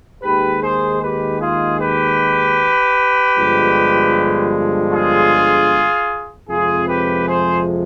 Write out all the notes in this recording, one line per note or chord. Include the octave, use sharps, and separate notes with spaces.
D#2 D#3 G#3 G4 B4
G#4 C5
G4 B4
F4 G#4
G4 B4
G1 G2 F3 G#3
F4 G#4
F2 C3 F3 G#3 F4 G#4
G4 B4
G#4 C5